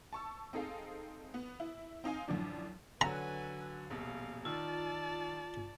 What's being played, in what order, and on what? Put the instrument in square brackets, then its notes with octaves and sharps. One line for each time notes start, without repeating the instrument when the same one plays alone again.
[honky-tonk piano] A5 C#6 E6
C4 D#4 G#4 A4 F5
B3
E4
C4 D#4 F5 G#5
F#2 A2 D3 F3 D4
[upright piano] D3 F#3 F#4 [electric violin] B4 G#5 [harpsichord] A#5
[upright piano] D#1 A#1 B2 [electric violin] F5
[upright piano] D#3 E6 [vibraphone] F4 [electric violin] D5 A5